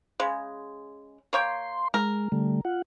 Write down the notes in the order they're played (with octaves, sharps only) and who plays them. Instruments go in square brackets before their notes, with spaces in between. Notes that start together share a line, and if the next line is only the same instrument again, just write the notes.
[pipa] C#3 G#3
[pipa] A#3 C#5 G5 [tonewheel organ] C6
[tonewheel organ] G#3 [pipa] A#4
[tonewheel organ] D3 G3 A3
F4 F#5